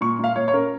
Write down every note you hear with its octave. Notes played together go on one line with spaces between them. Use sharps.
A#2 C#6
A#2 F5
A#2 C#5
C#5
C#4 A#4